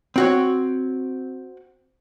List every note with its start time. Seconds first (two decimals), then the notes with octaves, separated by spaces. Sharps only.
0.16 C4 F#4 C#5